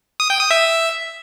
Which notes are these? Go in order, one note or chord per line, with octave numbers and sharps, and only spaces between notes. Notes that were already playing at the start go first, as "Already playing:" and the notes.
D#6
G5
D#6
E5